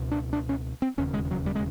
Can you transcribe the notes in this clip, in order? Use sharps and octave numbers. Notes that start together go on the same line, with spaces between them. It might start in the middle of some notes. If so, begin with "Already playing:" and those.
Already playing: C#2 B2
D4
D4
C#4
C4
E1 D#2 C#3 C#4
G#3
F#3
G3
G#3